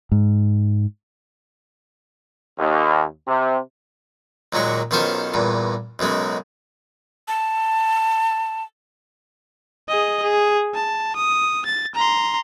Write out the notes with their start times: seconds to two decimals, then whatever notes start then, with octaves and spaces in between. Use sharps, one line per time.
0.12 G#2
2.58 D#2
3.27 C3
4.53 D#2 A#2 F#3 G#3 C#6
4.91 B1 D#3 C#4 F4 C5 C#5
5.34 E2 G2 A#2
5.99 B1 F#2 C#3 G#3
7.28 A5
9.88 G#4 D#5
10.23 G#4
10.74 A5
11.16 D#6
11.66 A6
11.95 A#5 C6